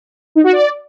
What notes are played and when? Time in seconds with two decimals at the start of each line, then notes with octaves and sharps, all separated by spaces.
0.35 D#4
0.44 F#4
0.52 D5